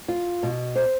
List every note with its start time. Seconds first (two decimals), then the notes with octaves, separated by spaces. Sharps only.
0.08 F4
0.43 B2
0.76 C5